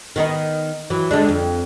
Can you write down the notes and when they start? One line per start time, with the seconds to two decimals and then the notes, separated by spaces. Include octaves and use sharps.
0.16 D#3 B3 D#4
0.90 E3 F#3
1.11 D3 G#3 D4
1.29 F2